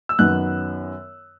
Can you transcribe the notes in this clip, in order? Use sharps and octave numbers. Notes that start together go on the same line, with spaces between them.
E6
F#2 D#3 F#3 B3 F#6